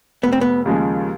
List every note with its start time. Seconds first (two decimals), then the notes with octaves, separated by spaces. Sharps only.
0.23 F1 B3
0.32 C4
0.41 B3
0.66 D#2 C#3 F3 G#3